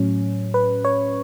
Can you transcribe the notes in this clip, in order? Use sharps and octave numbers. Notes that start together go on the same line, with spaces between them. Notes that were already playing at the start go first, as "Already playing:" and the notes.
Already playing: A2 F#3 C#4
B4
C#5